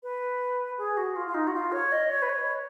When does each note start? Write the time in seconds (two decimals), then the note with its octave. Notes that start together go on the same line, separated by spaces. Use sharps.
0.03 B4
0.78 G#4
0.97 F#4
1.16 F4
1.28 F4
1.34 D#4
1.47 F#4
1.54 F4
1.72 C#5
1.92 D#5
2.10 C#5
2.22 B4
2.29 C#5